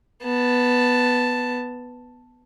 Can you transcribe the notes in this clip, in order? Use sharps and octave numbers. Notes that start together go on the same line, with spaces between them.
B3 A5